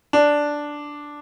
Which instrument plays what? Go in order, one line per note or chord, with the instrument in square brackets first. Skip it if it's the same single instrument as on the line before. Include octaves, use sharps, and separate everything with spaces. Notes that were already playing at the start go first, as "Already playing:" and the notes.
[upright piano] D4